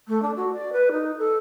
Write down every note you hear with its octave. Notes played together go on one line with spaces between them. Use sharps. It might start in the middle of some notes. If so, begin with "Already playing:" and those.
A3
D4
F#4
D5
B4
D#4
A4